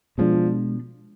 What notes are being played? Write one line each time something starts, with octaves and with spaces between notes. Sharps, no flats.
B2 F3 G#3 B3 D4